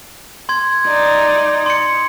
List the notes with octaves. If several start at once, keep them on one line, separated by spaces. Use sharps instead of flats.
C6 G#6
D#4 D5
C6 C#7